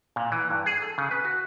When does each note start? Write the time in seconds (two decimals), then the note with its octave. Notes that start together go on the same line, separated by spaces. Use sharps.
0.16 A#2
0.32 E3
0.50 G2
0.66 G#4
0.82 A4
0.98 C#3
1.11 B4
1.25 F#4